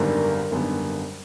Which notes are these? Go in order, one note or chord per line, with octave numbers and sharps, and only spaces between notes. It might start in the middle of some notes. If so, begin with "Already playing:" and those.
Already playing: G#1 F#2 D3 G3 B3 A#4
G#1 F#2 D3 G3 B3